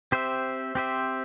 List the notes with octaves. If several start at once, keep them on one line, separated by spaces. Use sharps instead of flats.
C4 G4 C5 E5
C4 G4 C5 E5